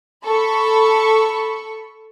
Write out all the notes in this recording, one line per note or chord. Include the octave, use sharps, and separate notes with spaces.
A4 B5 C#6